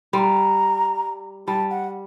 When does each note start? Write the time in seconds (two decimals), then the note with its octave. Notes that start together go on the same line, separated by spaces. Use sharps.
0.13 G3 C6
0.18 A#5
1.48 G3 A5
1.71 F#5